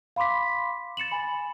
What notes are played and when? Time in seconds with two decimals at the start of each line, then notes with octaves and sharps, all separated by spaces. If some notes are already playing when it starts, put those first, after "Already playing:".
0.16 F5 B5 C6 D6 B6
0.97 A6 C#7 E7 F#7
1.11 G#5 B5